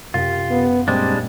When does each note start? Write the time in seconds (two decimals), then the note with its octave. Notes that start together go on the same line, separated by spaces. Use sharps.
0.14 C2 F#2 F4 G4
0.51 B3
0.88 A#2 G3 G#3 C4 D4